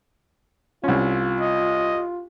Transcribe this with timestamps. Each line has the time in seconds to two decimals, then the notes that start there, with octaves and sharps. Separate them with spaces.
0.84 C2 C#4 F4
1.41 D#5